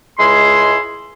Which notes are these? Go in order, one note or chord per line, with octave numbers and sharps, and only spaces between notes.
C#2 G#3 E4 C6